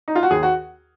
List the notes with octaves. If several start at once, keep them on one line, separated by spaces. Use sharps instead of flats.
D#4
F4
F#4
D#2 G#4
F#4